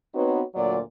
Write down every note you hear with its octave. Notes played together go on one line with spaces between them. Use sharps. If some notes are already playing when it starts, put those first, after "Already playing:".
B3 C4 D#4 F#4 B4 C#5
D2 A#2 F#3 D5